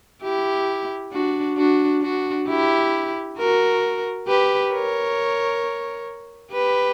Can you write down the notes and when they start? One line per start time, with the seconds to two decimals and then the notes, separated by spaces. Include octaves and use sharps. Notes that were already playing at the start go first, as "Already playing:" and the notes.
0.23 E4 G4
1.12 D4 F#4
1.57 D4 F#4
2.02 D4 F#4
2.48 E4 G4
3.38 F#4 A#4
4.27 G4 B4
4.73 A#4 C#5
6.53 G4 B4